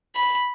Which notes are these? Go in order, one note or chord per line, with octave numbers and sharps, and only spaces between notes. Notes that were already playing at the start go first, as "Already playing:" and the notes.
B5